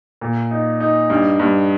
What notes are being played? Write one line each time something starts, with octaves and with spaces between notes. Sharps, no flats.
A#2
D#4
D#4
G2
G2